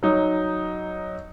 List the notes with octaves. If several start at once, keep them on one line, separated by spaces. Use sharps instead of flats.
F#3 D#4